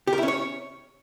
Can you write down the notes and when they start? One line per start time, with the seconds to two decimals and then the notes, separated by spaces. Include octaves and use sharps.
0.07 G4
0.13 A#4
0.18 E4
0.23 C#4
0.28 C#5